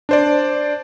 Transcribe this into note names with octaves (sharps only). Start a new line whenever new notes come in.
D4 C5 D5